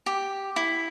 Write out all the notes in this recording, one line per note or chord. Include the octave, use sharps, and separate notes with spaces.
G4
E4